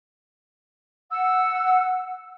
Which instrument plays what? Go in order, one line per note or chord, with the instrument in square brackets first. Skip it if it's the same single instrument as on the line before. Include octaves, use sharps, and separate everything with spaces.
[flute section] F#5 E6